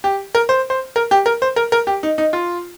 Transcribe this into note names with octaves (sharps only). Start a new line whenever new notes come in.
G4
A#4
C5
C5
A#4
G4
A#4
C5
A#4
A#4
G4
D#4
D#4
F4